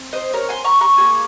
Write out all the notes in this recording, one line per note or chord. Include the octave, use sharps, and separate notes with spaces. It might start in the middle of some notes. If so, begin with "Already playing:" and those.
Already playing: C4
C5 D#5
A#4 C#5
G#5 C6
A#5 C#6
A#5 C#6
A#3 F4 G#4